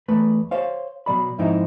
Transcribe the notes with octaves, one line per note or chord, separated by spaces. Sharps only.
E2 A3 B4
C5 C#5 F5
B2 F#3 D5 B5
F2 G#2 F3 C4 D#4 E4